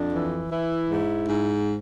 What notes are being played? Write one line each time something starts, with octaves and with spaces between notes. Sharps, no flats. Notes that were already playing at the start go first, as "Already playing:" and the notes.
Already playing: F2 D4
E3
E3 E4
G#2
G#2